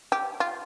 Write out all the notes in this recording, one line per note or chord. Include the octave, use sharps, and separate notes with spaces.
G4
F4